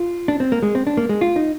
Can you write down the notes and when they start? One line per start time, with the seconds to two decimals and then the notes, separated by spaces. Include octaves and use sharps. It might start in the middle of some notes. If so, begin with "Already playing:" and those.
Already playing: F4
0.28 D4
0.40 C4
0.52 A#3
0.63 G#3
0.75 C4
0.87 D4
0.97 A#3
1.09 G#3
1.21 F4
1.36 D#4